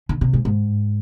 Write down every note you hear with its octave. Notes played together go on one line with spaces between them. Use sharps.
D3
C3
G#2
G#2